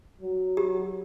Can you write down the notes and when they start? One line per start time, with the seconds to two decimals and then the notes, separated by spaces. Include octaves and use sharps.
0.21 F#3
0.57 G4